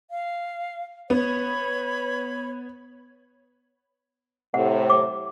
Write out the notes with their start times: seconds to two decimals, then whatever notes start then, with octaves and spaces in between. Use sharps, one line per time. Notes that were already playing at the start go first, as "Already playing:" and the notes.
0.09 F5
1.10 B3 C#5 B5
4.54 A2 C3 F#5
4.90 D6